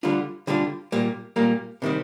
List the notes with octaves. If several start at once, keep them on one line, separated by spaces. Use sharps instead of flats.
D3 G3 D4 F4
D3 G3 D4 F4
A#2 G3 A#3
A#2 G3 A#3
C3 D#3 G3 C4